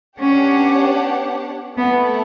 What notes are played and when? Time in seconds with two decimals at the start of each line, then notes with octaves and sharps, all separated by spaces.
0.19 B3 C#4 D4 G4 C#5 F#5
1.77 A3 B3 E4 A4